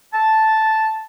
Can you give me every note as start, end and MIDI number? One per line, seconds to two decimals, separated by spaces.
0.14 1.03 81